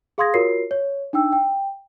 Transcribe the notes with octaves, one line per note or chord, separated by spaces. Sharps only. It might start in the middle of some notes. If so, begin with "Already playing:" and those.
G#4 F5 C6 D#6 G#6 A#6
F4 F#4 A#4 C#5 C7
C#5
D4 D#4 G5 E6
G5